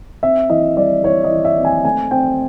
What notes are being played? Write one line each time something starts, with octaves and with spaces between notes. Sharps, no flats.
C4 E5
E3 D#5
G3 D5
E3 C#5
D#5
E3
E5
C4
G#5
A3 G#5
C4 G5